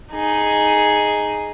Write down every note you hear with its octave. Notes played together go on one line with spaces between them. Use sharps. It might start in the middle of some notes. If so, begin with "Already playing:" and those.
D#4 G#4